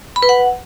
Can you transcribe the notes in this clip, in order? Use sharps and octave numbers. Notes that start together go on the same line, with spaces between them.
B5
B4
F#5